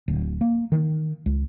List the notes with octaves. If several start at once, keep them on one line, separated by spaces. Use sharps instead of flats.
D1
A#3
D#3
C#2